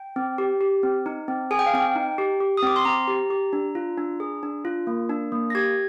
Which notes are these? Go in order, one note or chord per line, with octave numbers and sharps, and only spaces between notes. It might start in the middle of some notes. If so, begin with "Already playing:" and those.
Already playing: G5
C4
G4
G4
C4
D#4
C4
G#4 G#5
G5
F5
C4 G5
D#4
G4
G4
D#6
C4 D6
C6
C4 A#5
G4
G4
D4
F4
D4
G#4
D4
F4
A#3
D4
A#3
A#6
G4 G#6